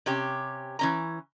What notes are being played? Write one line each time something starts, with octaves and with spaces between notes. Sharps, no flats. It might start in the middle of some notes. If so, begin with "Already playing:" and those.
C3 C#4 G4
E3 C#4 A#5